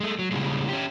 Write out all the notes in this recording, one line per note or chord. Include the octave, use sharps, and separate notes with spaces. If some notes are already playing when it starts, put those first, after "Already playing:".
G#3 A3
F#3
A#2 C#3 G3 G#3
C#4 G4